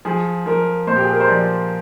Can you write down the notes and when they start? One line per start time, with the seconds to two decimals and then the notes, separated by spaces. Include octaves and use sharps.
0.05 F3 G#4
0.46 F3 A#4
0.87 A#2 C5
0.96 G4
1.04 G#4
1.12 A#4
1.20 C5
1.28 F3 D5